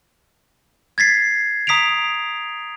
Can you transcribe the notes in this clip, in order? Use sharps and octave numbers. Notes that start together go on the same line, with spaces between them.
G#6 A6 B6 C7
A#5 D#6 B6 C7 D7 F7